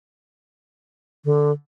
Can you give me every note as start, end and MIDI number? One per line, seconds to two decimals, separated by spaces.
1.25 1.52 50